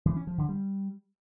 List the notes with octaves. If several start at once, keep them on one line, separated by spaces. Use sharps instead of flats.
E3
C#4
F3
D3
G3